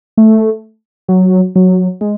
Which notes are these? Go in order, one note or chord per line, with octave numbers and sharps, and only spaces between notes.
A3
F#3
F#3
G#3